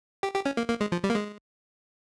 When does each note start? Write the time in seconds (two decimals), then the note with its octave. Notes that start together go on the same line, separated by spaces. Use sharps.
0.23 G4
0.35 G4
0.45 C#4
0.57 A#3
0.69 A#3
0.81 G#3
0.92 F3
1.04 G3
1.10 A#3
1.15 G#3